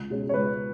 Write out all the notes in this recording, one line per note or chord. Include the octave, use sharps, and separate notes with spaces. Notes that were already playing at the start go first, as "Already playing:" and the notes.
Already playing: C#2
B2 G#3 C#4
C#5
C#2 B4